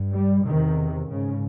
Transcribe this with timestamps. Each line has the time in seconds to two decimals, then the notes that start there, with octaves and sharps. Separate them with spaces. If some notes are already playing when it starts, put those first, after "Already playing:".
Already playing: G2
0.13 G3
0.45 E2 C3 D#3
1.08 G#2 C#3